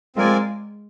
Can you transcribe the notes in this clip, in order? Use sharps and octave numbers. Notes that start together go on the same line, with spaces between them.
G#3 C4 F4 A#4 D5 G#5